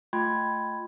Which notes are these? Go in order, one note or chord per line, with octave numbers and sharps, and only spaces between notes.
A3 F4 G5 B5 C6 G#6